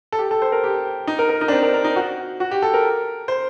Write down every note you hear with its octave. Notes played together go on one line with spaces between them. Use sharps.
A4
G4
A4
C5
A#4
G4
D#4
A#4
A#4
D#4
D4
C4
A#4
A#4
D#4
F#4
F#4
G4
A4
A#4
C5